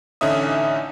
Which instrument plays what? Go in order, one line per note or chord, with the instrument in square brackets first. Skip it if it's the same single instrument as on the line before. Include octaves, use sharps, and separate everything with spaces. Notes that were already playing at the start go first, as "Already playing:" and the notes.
[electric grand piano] A1 D3 C#4 D#4 E5 D#6